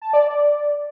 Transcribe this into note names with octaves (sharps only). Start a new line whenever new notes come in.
A5
D5
D5